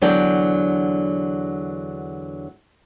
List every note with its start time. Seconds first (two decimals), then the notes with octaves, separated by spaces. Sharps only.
0.02 E2 D3 F#3 D4 D5 G5